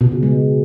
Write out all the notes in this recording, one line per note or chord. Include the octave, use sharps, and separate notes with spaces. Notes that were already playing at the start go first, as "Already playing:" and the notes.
B2
C#3
G#3